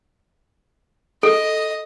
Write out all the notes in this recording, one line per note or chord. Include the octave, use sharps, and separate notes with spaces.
A4 D#5